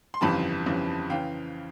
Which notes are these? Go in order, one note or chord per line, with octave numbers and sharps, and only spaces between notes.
C6
G1 F2 C#3 E3 G3 A5 B5
G1 F2 C#3 E3 G3
C#3 E3 F5 G5